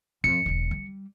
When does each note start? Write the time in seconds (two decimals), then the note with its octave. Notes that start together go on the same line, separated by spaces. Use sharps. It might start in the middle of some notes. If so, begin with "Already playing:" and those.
0.24 F2 C#7
0.46 E1 D3
0.71 G3